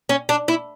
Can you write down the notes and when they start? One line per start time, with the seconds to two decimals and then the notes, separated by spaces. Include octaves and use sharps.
0.09 C#4
0.29 D4
0.48 E4